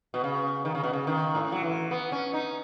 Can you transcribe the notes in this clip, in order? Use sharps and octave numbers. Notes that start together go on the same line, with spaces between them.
B2
C#3
D#3
C#3
B2
C#3
D#3
A2
F#3
E3
B3
C#4
D#4